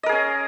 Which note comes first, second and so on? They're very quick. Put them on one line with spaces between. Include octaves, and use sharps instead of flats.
D#5 A#4 G#4 C#4